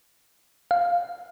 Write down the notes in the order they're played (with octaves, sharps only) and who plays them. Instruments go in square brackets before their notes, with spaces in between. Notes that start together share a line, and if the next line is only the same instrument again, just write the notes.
[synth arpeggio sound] F5